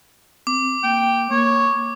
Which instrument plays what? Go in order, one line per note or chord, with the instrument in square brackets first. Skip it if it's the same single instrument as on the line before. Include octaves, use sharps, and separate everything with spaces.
[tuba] C4 [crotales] D6
[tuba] A#3 [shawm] G5
[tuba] A#3 [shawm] C#5